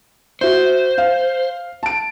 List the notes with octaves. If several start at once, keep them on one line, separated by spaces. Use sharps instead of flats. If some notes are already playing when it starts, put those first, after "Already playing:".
F#4 C5 E5
F5
A5 D7